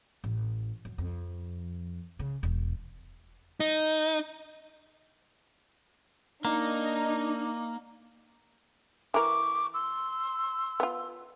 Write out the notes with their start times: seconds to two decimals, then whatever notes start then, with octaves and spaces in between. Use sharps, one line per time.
0.24 A1
0.85 F#2
0.98 F2
2.19 C#3
2.43 E1
3.60 D#4
6.45 A#3 D4 D#4 A#5
9.14 E3 A#4 C#6 D6
9.73 C6 E6
10.80 B3 F4